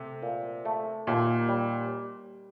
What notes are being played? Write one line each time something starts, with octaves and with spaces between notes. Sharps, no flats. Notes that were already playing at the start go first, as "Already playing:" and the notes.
Already playing: C3 A3
A#2
A3
D#2 A#2
G3